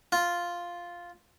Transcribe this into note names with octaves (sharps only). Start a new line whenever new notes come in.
F4